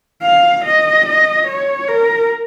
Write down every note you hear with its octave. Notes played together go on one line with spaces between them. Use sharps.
F5
D#5
D#5
C#5
A#4